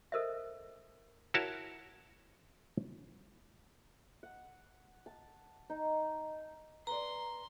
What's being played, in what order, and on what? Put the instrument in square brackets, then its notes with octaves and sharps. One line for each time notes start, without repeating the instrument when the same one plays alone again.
[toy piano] A4 A#4 C5 D#5 E5
[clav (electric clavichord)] E4 F#4 A#4 C#5 A5
[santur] F#5
A5
D#4
[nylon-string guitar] B4 D5 [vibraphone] A#5 [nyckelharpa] C6